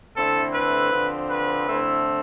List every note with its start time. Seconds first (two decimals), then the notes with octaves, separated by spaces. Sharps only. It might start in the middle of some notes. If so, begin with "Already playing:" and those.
0.16 D3 A3 C4 E4 A4
0.54 B4
0.91 D3 F3 C4
1.29 B4
1.68 D3 A3 C4 E4